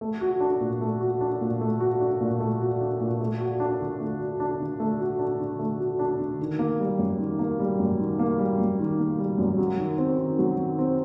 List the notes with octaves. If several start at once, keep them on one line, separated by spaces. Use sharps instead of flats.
A3
F#4
D4
A#2
A3
F#4
D4
A#2
A3
F#4
D4
A#2
A3
F#4
D4
A#2
A3
F#4
D4
D3
A3
F#4
D4
D3
A3
F#4
D4
D3
A3
F#4
D4
D3
D#3
A#3
G3
F#2
D#3
A#3
G3
F#2
D#3
A#3
G3
F#2
D#3
A#3
G3
F#2
F#3
D#3
C4
D#3
F#3
D#3
C4